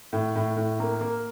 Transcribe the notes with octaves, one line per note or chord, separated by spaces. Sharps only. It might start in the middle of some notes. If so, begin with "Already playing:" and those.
A2
A2
A2
A#3
A#3